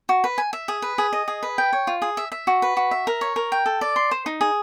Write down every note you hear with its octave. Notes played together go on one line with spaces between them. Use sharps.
F#4
B4
G#5
E5
G#4
B4
G#4
D#5
G#4
B4
G5
C#5
F4
G#4
E5
E5
F#4
B4
F#4
E5
A#4
C#5
A#4
G5
A4
D5
C6
C5
D#4
G#4